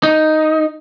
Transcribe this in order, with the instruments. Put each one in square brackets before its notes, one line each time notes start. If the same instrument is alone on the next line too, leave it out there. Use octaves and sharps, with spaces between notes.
[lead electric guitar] D#4